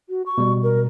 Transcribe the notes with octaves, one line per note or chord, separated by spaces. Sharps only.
F#4
C#6
B2 G3
A#4